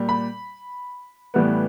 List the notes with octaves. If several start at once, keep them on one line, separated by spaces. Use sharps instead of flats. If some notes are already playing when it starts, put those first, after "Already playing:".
Already playing: A#2 G3
B5
A2 E3 G3 B3